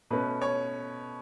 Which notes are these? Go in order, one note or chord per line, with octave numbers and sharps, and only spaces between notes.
B2 A3 C#4 B4
C#5